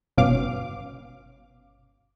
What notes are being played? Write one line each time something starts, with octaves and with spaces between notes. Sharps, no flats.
G1 B2 C#4 F5 D6